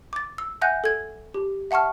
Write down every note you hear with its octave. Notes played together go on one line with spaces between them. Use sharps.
D6 A6
E6
E5 F#5 G#5 F#6 G6 A#6
A4 G#6
G4
E5 F#5 A5 C#6 F6